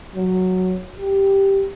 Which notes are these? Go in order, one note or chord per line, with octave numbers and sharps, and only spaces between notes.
F#3
G4